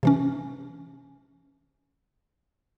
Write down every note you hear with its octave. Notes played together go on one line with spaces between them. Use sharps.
C3 E3 C#4